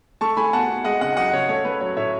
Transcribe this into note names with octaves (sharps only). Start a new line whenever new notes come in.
A3 A5 C#6
A3 G#5 B5
B2 F#5 A5
B2
G#3 D#5 F#5
C#3 D#5 F#5
F#2 D#5 F#5
C#3 C#5
A3 C#5
A3 B4
F#3 C#5
A2 C#5 E5